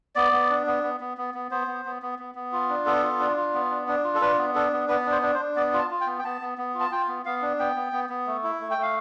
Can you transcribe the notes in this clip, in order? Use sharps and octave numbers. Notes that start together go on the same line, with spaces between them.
B3 D5
B3
D4
B3
B3
B3
B3
B3
B3 C5
B3
B3
B3
B3
B3
F4
D4
B3 A4
F4
D4
F4
B3
D4
D4
F4
A4
D4 B4
B3
D4 A4
B3
B3 B4
D4
C5
D4
C5
D4
B3 D5
F4
A5
F4
G5
B3
G5
B3 A5
B3
B3
F4
A5
F4 G5
B3
B3 F5
D4
B3 G5
B3
B3
B3
A3
E4
A3
G5
A3 F5